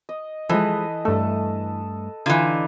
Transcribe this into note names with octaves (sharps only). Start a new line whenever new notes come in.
D#5
E3 F3 G#3 A4 B4 D#5
G2 A3 A4
D3 E3 D#4 F4 A#5